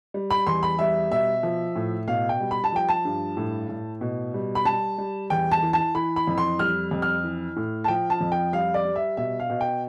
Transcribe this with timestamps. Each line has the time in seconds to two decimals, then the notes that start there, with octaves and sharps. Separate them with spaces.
0.14 G3
0.30 B5
0.46 E2 C6
0.63 B5
0.79 G3 E5
1.11 B2 E5
1.43 F3
1.76 A2
2.08 B2 F5
2.29 G5
2.40 G3
2.51 B5
2.64 A5
2.72 F3 G5
2.89 A5
3.05 G2
3.37 A2
3.69 A2
4.01 B2
4.34 G3
4.55 B5
4.66 G3 A5
4.98 G3
5.30 E2 G5
5.52 A5
5.63 E3
5.73 A5
5.95 E3 B5
6.16 B5
6.27 F2
6.38 C6
6.59 G3 F6
6.91 F2
7.02 F6
7.24 E3
7.56 A2
7.84 A5
7.88 F3 G5
8.10 A5
8.21 F2
8.32 G5
8.53 G3 F5
8.74 D5
8.85 G3
8.96 E5
9.17 B2 E5
9.40 F5
9.50 B2
9.61 G5